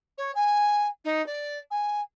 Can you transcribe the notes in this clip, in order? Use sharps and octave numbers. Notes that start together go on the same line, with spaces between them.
C#5
G#5
D#4
D5
G#5